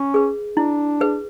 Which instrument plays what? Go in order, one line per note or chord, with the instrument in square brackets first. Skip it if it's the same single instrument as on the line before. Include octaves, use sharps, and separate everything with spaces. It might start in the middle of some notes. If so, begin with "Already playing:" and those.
Already playing: [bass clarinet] C#4
[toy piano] G#4 B4
[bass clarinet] D4 [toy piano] E4
[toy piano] G#4 B4